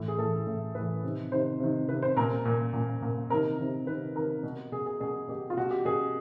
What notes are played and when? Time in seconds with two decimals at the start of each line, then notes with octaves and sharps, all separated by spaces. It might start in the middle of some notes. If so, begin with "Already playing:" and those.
Already playing: A2 E3
0.08 G#4
0.18 A2 E3 A4
0.46 A2 E3
0.75 A2 E3 B4
1.03 C3 D#3
1.32 C3 D#3 C5
1.60 C3 D#3
1.88 C3 D#3 B4
2.02 C5
2.17 A#2 A#4
2.45 A#2
2.73 A#2
3.02 A#2
3.30 C3 D#3 A#4
3.59 C3 D#3
3.86 C3 D#3 B4
4.15 C3 D#3 A#4
4.43 B2
4.72 B2 G#4
4.86 G#4
5.00 B2 G#4
5.29 B2 G4
5.50 F4
5.57 B2 F#4
5.71 G4
5.85 B2 G#4